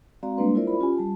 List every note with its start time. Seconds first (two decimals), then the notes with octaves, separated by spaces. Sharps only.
0.23 G#3 C4 F#4 D5 F5 A#5
0.37 G3 G#3 A#3 D4 B4 C6
0.55 E4 F4 A#4 C5 D5 E5
0.67 B5
0.79 C#4 F4 G4 G#5
0.98 G3 A5